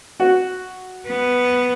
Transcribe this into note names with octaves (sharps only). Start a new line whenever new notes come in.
F#4
B3